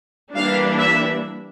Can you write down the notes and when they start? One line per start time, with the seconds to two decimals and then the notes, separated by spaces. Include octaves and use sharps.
0.35 E3 G3 A#3 D4 F5
0.80 E5